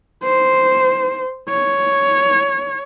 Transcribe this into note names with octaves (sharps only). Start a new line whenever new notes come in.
C5
C#5